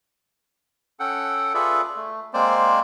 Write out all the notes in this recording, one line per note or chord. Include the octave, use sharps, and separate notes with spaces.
C#4 A4 F#5 G5
F4 G#4 A4 B4 D5 E5
A3
G#3 A#3 C4 C5 D5